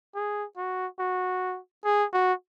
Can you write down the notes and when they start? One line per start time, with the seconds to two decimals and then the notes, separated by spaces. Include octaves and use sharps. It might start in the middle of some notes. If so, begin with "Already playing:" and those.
0.15 G#4
0.57 F#4
1.00 F#4
1.85 G#4
2.13 F#4